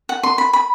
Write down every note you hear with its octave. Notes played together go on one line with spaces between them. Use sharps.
F#5
C6
B5
B5